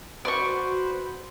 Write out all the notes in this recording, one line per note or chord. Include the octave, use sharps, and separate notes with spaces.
F#4 B4 C5 D5 C#6